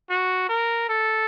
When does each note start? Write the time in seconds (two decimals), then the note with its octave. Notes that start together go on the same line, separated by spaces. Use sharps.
0.10 F#4
0.49 A#4
0.89 A4